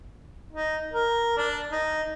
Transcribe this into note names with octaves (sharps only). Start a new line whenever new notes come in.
D#4
A#4
D4
D#4